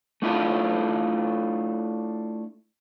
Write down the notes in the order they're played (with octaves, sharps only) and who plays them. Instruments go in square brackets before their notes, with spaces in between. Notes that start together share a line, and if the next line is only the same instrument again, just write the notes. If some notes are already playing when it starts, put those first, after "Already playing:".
[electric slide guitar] A3 D4 E4 F4 A4